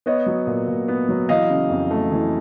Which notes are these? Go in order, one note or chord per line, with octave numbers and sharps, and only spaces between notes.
B3 C#5 D#5
F#3
A#2
A#2
B3
F#3
E3 D#5 F5
C#3
F2
A3
E3